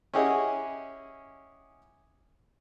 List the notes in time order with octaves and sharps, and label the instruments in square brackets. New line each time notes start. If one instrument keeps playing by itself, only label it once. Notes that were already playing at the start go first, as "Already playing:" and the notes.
[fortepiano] C#4 E4 G4 G#4 D#5 F#5